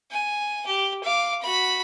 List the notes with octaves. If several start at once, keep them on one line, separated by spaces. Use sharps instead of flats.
G#5
G4
F5 D6
F#4 B5